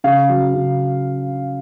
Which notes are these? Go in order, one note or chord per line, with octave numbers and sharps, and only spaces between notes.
C#3 F5
F#3
C#3